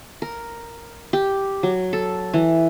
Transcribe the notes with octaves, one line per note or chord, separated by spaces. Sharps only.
A#4
G4
F#3
A4
E3